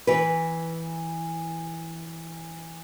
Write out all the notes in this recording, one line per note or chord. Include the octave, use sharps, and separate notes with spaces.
E3 B4